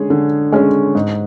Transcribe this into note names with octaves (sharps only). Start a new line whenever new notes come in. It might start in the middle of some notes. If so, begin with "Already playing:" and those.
Already playing: D3 G#3 C#4 G#4 C#5
D3
G#3 C#4 G#4 C#5
G#2